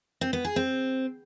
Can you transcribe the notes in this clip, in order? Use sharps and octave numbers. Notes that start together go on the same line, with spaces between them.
C4
B3
G#4
C4